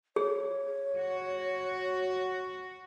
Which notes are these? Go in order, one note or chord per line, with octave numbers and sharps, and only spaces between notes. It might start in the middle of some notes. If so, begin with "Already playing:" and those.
G#4 C#5
F#4